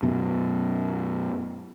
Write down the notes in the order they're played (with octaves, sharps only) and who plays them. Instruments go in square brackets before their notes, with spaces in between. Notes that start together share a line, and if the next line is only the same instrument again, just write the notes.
[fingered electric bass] F#2 B2